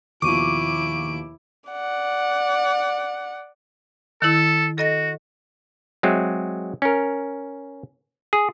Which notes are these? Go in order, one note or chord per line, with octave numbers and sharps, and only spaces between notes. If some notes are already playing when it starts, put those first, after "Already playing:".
D#2 B2 F3 E4 C#6 D6 D7 D#7
D5 F#5
D#3 E4 A4
F#4 A4 D#5 A#6
F#3 G#3 C4 E5
C#4 A#4
G#4